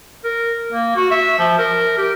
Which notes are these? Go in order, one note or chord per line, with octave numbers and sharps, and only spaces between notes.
A#4
A#3
F#4
E5
F3
A#4
G4